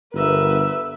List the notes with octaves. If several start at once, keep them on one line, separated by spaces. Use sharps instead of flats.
G1 A#4 B4 E5